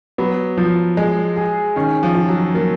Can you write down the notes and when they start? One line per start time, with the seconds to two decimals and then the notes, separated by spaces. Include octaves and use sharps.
0.18 F#3 B3
0.58 F3
0.97 G#3
1.36 G#4
1.76 D#3 C#4
2.03 F3
2.15 F4
2.28 F#3
2.54 F#3 A#3